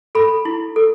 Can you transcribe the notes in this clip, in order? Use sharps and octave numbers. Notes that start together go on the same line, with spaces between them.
A4 B5
E4
A4